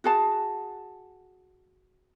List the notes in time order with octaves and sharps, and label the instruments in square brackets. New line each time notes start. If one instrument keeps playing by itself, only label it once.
[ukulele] F#4 G#4 A5